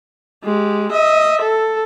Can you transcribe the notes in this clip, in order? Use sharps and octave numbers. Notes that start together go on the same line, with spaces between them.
G#3 G4
D#5 E5
A4